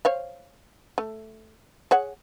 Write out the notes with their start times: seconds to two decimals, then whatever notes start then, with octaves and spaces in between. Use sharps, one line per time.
0.05 C5 C#5 F5
0.98 A3
1.91 G#4 C#5 F#5